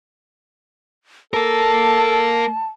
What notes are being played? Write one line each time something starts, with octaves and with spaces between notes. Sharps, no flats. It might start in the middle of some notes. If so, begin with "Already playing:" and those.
A#3 A4 A#4 A5